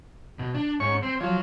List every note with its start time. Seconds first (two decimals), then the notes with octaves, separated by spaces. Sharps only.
0.39 B2
0.55 D4
0.80 G#2 C#4 C#6
1.03 C4 C5
1.20 F3 F#3 C#5